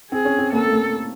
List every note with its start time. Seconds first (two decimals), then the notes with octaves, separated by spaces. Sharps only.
0.12 C4 G#4
0.25 C#4
0.39 C4
0.53 A#3 A4
0.66 A3
0.73 A#3